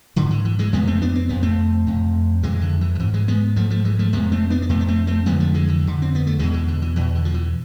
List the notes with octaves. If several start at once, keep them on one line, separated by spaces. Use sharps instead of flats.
G#2 D3
E3
E3
E3 G#3
F2 C3 G#3 B3
A3 C4
B3 D4
C4
F2 C3 B3
A3 C4
F2 C3
F2 C3 E3 G#3
D3
E3
F3
G#2 E3
E3 G#3
G#3 B3
G#2 F3 A3
F3 A3
E3 G#3
F3 A3
F2 C3 G#3 B3
A3 C4
B3 D4
B3
F2 C3 A3 C4
B3
A3 C4
A3 C4
F2 D3 G#3 B3
F3 A3
E3 G#3
E3
F2 D3
C4
B3
A3
E2 B2 E3 G#3
E3
D3
E3
E2 B2 E3
D3
F3
E3